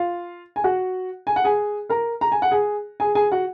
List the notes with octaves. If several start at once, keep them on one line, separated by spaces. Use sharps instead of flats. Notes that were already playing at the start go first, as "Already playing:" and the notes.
Already playing: F4 F5
G#5
F#4 F#5
G#5
F#5
G#4 G#5
A#4 A#5
A#5
G#5
F#5
G#4 G#5
G#4 G#5
G#4 G#5
F#4 F#5